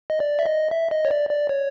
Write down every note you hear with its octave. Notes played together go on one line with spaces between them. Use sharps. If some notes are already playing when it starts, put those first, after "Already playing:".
D#5
D5
E5
D#5
E5
D#5
C#5
D5
D5
C#5